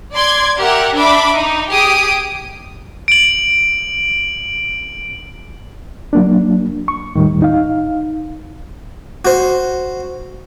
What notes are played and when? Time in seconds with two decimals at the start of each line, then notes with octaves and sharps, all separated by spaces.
0.14 D5 C6 G#6
0.58 G4 A#4 E5 F#5
0.95 D4 E5 B5 D6
1.35 D#4
1.71 G4 G#4 D#6 D7
3.08 D7 F#7
6.13 F#3 A#3 D4
6.88 C#6
7.16 D#2 A2 D#3 G3
7.42 D#4 F5
9.25 F#4 C5